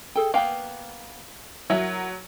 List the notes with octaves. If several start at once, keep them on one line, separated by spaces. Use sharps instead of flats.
G#4 A4 G5
A#3 B3 F5 G5
F#3 E4 A#4 E5